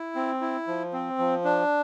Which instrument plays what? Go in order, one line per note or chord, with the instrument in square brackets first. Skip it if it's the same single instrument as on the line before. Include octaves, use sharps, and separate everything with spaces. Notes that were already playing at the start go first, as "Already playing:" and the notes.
Already playing: [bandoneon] E4
C4
E4
F3
C4
F3
D4